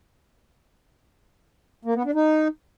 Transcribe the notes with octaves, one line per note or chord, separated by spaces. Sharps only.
A#3
B3
D4
D#4